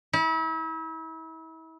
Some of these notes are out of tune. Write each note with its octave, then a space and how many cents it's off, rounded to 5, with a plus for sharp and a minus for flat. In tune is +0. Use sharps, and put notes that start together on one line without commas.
E4 -35